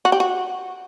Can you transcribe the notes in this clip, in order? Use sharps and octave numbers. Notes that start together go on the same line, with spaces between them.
F#4
G4
F#4